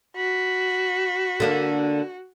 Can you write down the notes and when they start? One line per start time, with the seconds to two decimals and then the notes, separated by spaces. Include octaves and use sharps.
0.16 F#4 B5
1.40 D3 A#3 D4